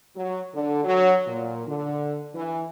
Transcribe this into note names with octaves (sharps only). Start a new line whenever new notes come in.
F#3
D3
F#3
A#2
D3
E3